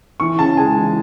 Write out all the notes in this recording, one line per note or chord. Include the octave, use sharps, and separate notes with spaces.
E3 C#6
C#3 A5
G#3 G#5
E3